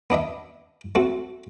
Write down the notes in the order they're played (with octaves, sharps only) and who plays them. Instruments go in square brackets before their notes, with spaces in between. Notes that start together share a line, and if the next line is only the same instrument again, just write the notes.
[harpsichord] B3 D4 D#5 E5
A3 C4 F#4